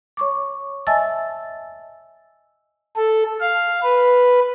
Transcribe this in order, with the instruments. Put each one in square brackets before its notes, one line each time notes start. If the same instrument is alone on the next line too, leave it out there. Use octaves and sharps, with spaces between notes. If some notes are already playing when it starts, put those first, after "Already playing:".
[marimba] C#5 C#6 D6
D#5 E5 G#5 A5 E6 A6
[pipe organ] A4
F5
B4